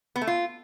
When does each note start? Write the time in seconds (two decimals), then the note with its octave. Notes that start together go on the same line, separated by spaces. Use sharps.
0.16 B3
0.21 A3
0.27 F4